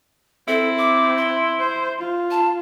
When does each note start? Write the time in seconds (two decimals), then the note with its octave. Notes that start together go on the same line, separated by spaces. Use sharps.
0.48 C4 E4 A4
0.78 D6
1.17 C6
1.60 C5
1.99 F4
2.31 A5